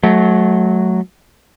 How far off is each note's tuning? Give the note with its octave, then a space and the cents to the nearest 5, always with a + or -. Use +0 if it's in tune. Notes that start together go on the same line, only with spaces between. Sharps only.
F#3 +0 A3 -30